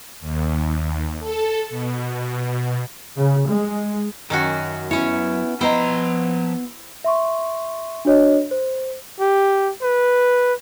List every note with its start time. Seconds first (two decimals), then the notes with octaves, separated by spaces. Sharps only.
0.21 D#2
1.20 A4
1.70 B2
3.17 C#3
3.47 G#3
4.30 F#2 D#3 C#4 F#4
4.91 B3 C#4 E4 C#5
5.61 F3 B3 E4 C5 D#5 G5 A#5
7.04 E5 C6 C#6
8.05 D4 F#4 C#5 D#5
8.51 C5
9.20 G4
9.82 B4